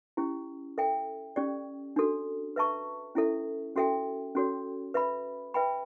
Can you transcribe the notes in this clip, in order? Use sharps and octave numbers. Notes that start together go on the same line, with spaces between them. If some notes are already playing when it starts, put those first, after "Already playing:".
C#4 E4 G4
A4 E5 G5
C#4 G4 D5
D4 F#4 A4
B4 E5 A5 C#6
C#4 E4 A4 E5
C#4 F#4 A4 E5 G5
C#4 F#4 A4 C#5
B4 E5 B5
B4 E5 G5 B5